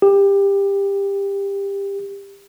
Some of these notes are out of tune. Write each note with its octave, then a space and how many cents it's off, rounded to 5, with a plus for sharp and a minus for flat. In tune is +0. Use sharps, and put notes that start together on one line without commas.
G4 +20